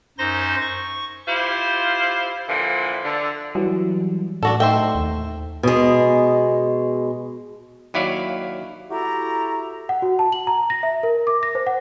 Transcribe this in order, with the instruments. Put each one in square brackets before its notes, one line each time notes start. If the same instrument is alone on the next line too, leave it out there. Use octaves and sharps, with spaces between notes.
[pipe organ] F#2 D#4 C5 C6 A#6
C#6
[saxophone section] E4 F4 G4 C5
A#2 D3 E3 F3
D3
[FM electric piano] E3 F#3 [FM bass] G3
[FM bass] A2 [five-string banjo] D4 F#4 A4
[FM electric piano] A3 D#4 [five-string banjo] C5 E5 G5
[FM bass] D#2
[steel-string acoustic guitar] B2 G#3
[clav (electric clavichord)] D#2 F#3 E4 D5 F5
[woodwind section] E4 F#4 G4 A4 E5 A#5
[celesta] F#5
F#4
A5
F#7
A#5
A#6
E5
A#4
D6
A#6
C5
F#5